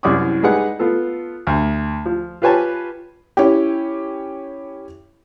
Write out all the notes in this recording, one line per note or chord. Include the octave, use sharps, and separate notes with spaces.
C2 F#2 E4 D5 D6 D#6
G3 G#3 D#4 G#4 B4 F#5
B3 F4 A4
D2
F3
F4 G4 B4 C#5 G#5 A5
C#4 E4 G4